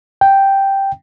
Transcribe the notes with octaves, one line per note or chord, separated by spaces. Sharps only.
G5